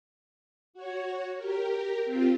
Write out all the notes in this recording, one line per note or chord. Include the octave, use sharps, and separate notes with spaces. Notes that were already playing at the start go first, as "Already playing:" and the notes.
F#4 C#5
G4 A#4
C4 F4 G4